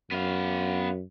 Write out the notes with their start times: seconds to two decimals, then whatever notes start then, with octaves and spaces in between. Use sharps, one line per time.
0.11 F#2 B3 F5